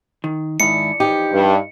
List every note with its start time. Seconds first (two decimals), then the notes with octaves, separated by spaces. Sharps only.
0.24 D#3
0.60 G#2 D#3 D4 E4 C#7
1.00 E3 F3 D#4 G4
1.33 G2